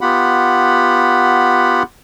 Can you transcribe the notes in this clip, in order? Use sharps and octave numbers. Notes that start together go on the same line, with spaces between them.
B3 F4 G4 F#5 B5